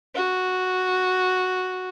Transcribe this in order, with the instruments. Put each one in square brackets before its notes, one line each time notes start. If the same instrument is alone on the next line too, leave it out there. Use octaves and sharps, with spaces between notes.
[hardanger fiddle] F#4